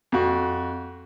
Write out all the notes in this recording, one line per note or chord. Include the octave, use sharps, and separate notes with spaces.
F2 F#4